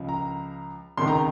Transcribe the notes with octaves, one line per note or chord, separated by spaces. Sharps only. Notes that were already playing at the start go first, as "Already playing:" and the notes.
Already playing: C#2 C#3 F3
A#5
C#2 C3 D#3 C6
A#5